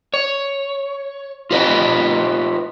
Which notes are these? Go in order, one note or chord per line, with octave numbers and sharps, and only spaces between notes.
C#5
F4 G4 B4 C5 D#5